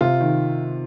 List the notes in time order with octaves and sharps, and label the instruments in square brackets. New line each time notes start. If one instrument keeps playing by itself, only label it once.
[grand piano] C3 [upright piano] F4
[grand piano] D#3